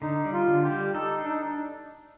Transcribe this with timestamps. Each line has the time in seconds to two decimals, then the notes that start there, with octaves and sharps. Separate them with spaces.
0.02 D3 D#4
0.25 G3
0.33 F4
0.48 D3
0.64 G4
0.71 G3
0.94 D#4 A4
1.18 D4
1.29 D#4